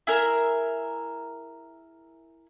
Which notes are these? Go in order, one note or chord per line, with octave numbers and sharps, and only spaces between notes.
E4 G#4 A#4 E5